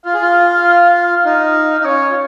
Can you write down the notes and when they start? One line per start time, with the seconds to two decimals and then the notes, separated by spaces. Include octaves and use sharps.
0.05 F4 F5
0.14 G#4
0.22 F4
1.25 D#4
1.80 D#4
1.84 C#4 C#5
2.10 F4